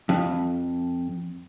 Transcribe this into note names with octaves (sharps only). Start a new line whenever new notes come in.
F2